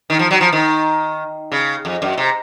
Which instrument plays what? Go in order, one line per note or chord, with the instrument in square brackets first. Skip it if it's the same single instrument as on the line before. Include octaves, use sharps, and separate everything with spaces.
[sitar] D#3
F3
F#3
F3
D#3
C#3
F2
F#2
C3